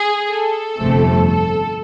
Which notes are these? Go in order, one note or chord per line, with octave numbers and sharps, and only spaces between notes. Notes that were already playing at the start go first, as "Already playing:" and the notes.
Already playing: G#4
A4
G1 F2 C3 F3 A3
A4